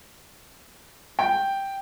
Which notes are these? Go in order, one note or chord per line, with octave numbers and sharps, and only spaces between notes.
G5